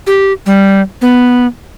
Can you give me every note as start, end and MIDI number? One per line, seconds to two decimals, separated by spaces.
0.07 0.33 67
0.46 0.81 55
1.02 1.46 59